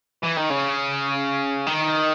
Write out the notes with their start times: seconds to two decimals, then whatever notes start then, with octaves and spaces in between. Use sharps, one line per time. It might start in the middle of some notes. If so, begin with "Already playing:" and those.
0.23 E3
0.36 D#3
0.50 C#3
1.67 D#3